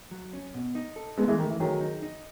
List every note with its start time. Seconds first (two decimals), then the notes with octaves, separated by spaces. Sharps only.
0.11 F#3
0.33 C#4
0.54 B2
0.75 D#4
0.96 A4
1.18 G#3 A3 B3
1.28 E3 G#3
1.39 D#3 A3
1.50 E3
1.60 D#3 F#3 G#4
1.81 D#4
2.02 D#4